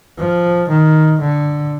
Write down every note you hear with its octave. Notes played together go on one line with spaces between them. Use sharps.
F3
D#3
D3